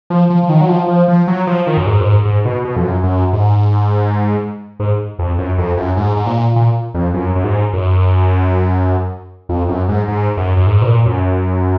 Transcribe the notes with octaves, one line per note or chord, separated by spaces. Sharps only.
F3
F3
F3
D#3
F#3
F3
F3
F3
F#3
F3
D#3
F#2
G#2
F#2
G#2
G#2
B2
B2
F2
F#2
F#2
G#2
G#2
F2
F#2
F2
F#2
G#2
G#2
A#2
A#2
F2
F#2
F#2
G#2
F#2
F2
F#2
G#2
G#2
F#2
F#2
G#2
B2
A#2
F#2